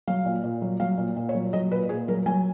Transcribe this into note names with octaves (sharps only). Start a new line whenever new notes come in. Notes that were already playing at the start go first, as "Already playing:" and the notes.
F#3 F5
A#2
A#2
F#3
F#3 F5
A#2
A#2
C#5
F#3
F#3 D#5
A#2 B4
A#2 G#4
F#3 A#4
F#3 G#5